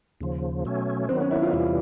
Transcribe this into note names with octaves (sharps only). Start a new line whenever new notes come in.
D#2 C#3 F3
B2 F#3 A3 C#4
D#3 F#3 B3 C4
C#4
E4
F4
E2 C3 E3 G3 E4
F4